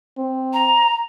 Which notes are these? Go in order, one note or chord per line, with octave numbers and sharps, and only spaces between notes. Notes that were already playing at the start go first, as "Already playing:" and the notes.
C4
A#5